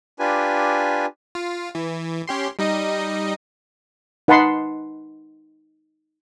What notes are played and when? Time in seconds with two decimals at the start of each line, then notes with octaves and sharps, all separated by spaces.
0.19 D4 F4 G4 B4 G#5
1.35 F4
1.75 E3
2.28 C#4 G4 C6
2.59 G3 D#4 D#5
4.28 D#4 B4 F#5 A5 B5 C6